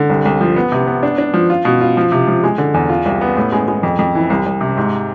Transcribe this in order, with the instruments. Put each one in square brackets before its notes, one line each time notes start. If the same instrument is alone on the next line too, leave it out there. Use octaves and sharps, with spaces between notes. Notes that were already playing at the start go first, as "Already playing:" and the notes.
Already playing: [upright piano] D3
C2
C2
F3
B3
C3
B3
D4
D4
F3
F4
B2
F4
F3
C3
F3
G#3
D3
E2
F4
C2
B3
A2
G#3
G#3
F2
F2
E3
C2
C2
C3
G#2